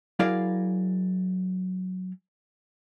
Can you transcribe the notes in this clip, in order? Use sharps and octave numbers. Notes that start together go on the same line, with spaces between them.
F#3 E4 G#4 A#4 D5 F5